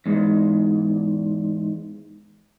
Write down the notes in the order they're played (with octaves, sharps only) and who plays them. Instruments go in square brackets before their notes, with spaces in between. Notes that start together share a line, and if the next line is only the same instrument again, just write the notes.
[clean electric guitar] E2 G#2